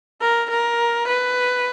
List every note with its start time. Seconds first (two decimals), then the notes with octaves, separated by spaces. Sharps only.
0.21 A#4
0.51 A#4
1.08 B4